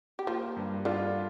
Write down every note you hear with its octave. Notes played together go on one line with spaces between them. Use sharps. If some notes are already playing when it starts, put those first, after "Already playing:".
G4
F3 A#3 F4
G2
D3 D4 F4